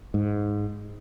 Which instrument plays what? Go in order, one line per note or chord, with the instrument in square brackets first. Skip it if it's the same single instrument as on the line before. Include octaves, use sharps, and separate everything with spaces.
[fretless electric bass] G#2